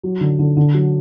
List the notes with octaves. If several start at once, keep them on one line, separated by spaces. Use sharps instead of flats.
F#3
D3
D3
D3
F#3